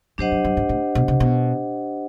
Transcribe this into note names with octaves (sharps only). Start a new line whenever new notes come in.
F#2 D4 G4 C5 D#5 F#5
F#2
G2
G#2
A2
B2
C3
B2